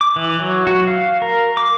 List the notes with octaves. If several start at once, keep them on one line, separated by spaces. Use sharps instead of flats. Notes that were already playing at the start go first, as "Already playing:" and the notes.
D6
E3
F#3
F#4
F5
A#4
D6